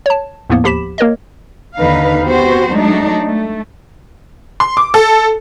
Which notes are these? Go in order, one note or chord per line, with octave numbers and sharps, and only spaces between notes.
C#5 A5
E2 A2 F3 A#3 B3
D#2 F3 G4 B5 B6 E7
A#3 A#4 C#5 D#5
D#2 D3 D#4 B4 F5
B3 C4 F#4 G4 C5
F#3 G#3 A3 D4 D#4
A3
C6
D6
A4